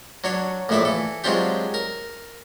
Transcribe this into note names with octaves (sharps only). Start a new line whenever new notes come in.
F#3 D4 C#5
A#1 A2 A3 D4 E5 D6
E3 A4
F#3 G#3 C4 D4 F4 G4
A#4